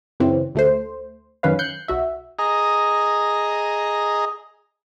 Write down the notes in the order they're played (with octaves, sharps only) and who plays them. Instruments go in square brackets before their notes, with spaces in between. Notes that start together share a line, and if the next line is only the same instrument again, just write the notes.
[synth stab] F#2 C#3 E3 C4
D2 A3 C5
F#2 D#3 C#4 B4 F5
F#6 G6 C7 C#7
B1 F#4 E5
[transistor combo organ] G#4 D#5 A#5